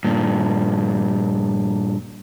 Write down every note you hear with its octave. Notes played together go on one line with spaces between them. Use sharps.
G2 A#2